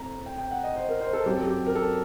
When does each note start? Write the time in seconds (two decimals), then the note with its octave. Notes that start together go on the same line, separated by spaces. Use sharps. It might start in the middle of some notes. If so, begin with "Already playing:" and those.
Already playing: A2 A3 C4 A#5
0.26 G5
0.38 G5
0.51 F#5
0.64 D#5
0.76 C5
0.89 A#4
1.01 C5
1.13 A4
1.26 F#2 F#3 C4 G4
1.37 A4
1.47 G4
1.66 A#4
1.75 A4